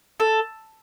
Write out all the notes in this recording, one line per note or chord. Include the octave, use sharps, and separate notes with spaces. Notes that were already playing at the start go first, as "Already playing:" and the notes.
A4